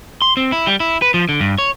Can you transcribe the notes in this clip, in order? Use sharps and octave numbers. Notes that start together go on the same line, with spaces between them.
C6
C4
E4
G3
E4
B4
F3
D3
G2
C#5